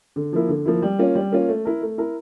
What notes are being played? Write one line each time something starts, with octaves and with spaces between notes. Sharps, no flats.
D3
F3 A#3 E4
D3
F3 A#3 E4
G3
A#3 C#4 F4
G3
A#3 C#4 F4
A3
E4 A#4
A3
E4 A#4